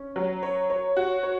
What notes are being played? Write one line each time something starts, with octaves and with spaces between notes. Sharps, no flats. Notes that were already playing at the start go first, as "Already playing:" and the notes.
Already playing: C#4
F#3
C#5
C#5
F#4
C#5